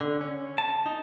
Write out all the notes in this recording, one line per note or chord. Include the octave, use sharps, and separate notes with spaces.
D3
C#4
A5
D#4